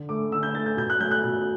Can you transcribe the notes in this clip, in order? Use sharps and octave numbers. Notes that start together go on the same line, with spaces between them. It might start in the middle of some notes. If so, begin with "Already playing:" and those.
Already playing: D3
A3 D6
D3 E6
G6
A3 A6
G6
B2 G6
F#6
F#3 A3 G6
F#6
B2